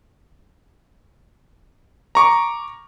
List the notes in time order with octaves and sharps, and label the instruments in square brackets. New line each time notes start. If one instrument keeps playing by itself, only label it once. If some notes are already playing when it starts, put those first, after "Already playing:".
[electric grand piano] A#5 C#6 D6